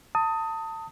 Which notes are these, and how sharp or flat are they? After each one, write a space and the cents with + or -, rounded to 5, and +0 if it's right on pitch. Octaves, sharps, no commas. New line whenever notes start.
A5 +30 D#6 +15